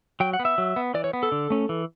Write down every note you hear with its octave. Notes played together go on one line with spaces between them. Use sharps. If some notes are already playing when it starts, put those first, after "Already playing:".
F#3 G5
F#5
B3
E5
F#3
B3
E3 D5
C#5
B3
A4
D3
A3 C#4
E3